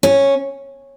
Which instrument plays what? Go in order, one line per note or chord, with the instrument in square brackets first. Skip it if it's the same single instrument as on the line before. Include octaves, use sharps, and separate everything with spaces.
[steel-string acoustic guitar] C#4